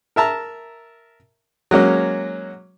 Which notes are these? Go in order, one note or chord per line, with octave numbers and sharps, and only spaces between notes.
A#4 E5 A5 A#5
F#3 G#3 A#3 C#4